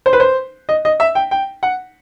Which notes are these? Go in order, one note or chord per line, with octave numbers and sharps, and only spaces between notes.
C5
B4
C5
D#5
D#5
E5
G5
G5
F#5